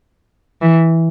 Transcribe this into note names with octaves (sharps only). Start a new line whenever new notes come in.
E3